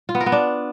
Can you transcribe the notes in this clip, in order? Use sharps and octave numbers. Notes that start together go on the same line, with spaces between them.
F4
B3
A#4
B3
D4